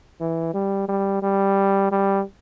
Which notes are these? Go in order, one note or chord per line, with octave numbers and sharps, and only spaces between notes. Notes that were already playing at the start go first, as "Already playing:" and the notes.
E3
G3
G3
G3
G3